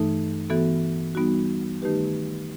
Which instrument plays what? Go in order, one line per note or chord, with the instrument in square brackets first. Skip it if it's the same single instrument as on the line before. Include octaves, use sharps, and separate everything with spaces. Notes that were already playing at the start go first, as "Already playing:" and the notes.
Already playing: [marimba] G2 E3 A3 D#4 A4
E3 B3 F#4 A4
G3 B3 D#4 F#4
D#3 A3 D#4 G4 B4